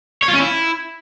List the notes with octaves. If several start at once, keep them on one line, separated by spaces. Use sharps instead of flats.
C#5
F4
C#4
E4